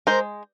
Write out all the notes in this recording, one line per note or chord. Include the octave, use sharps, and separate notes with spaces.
G#3 A#4 C5